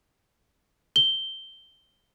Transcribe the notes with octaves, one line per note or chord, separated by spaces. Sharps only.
G7